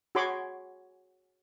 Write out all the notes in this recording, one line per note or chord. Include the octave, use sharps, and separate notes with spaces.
F#4 G#4 C#5 B5 C6 D6